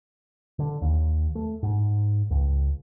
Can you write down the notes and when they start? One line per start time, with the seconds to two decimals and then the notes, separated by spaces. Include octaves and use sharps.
0.59 D3
0.82 D#2
1.35 A3
1.63 G#2
2.30 C#2